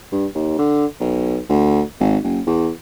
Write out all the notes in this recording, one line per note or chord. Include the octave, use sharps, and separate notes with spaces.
G2
D#2
D3
B1
D2
G#1
F#1
E2